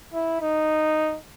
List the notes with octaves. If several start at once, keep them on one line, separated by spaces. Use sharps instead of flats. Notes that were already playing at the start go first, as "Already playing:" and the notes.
E4
D#4